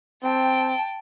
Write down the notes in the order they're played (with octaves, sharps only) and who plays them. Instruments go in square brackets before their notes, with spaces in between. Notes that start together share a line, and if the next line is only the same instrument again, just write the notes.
[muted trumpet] C4 [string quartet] G5 A5